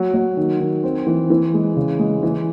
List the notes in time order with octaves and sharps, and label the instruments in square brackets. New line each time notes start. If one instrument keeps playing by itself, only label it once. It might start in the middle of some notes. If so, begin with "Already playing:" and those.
Already playing: [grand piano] F#3
F#3
D#3
D#3
C4
E3
E3
G#3
C#3
G#3
E3